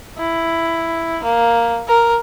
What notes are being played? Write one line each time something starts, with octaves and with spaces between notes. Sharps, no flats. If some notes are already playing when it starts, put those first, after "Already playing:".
E4
A#3
A#4